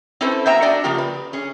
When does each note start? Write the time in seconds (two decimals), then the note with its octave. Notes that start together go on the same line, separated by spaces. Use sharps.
0.21 C4 C#4 E4 A4 B4 C5
0.46 F#3 A#3 B3 E5 G5 A#5
0.62 D4 F#4 D5 D#5
0.84 C#3 F3 A#3 F4 G4
0.98 B4
1.33 C#4 G#4